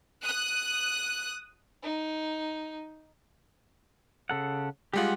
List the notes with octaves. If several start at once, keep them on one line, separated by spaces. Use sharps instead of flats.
D#6 F#6
D#4
C#3 A4 F#5
G3 G#3 F4 G4 F#5